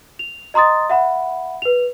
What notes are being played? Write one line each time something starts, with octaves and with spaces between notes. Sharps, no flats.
F7
D#5 A#5 C6 D#6 A6
E5 F#5 B5
B4 F7